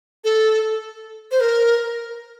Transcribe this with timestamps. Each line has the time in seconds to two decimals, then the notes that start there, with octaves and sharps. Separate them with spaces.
0.24 A4
1.31 C5
1.40 A#4